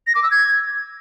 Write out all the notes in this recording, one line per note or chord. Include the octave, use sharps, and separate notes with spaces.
A#6
D6
E6
G#6